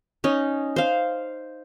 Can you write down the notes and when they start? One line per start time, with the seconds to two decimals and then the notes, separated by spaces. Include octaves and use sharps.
0.24 C#4 D#4
0.76 C5 F5